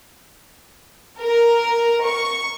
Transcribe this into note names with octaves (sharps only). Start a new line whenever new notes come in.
A#4
C#6